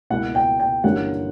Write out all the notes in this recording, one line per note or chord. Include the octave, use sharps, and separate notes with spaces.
C#2 B2 A#3 E4 F#5
G5
G5
G1 G2 E3 A#3 C#4 F#5